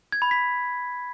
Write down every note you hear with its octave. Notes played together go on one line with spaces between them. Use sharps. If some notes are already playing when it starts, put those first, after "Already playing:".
G#6
B5
B6